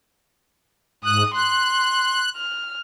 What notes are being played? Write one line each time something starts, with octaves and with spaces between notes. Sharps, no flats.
G#2 D#6 F#6
C6 F#6
F6